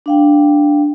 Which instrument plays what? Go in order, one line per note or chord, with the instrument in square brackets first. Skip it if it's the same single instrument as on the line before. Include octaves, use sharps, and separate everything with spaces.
[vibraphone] D4 F5 G5